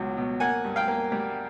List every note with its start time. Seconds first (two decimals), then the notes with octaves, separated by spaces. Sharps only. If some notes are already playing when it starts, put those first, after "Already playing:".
Already playing: C#2 B2 F#3
0.17 B2
0.40 A#3 F#5 G#5
0.65 G2
0.76 F5 G5
0.88 A#3
1.12 G3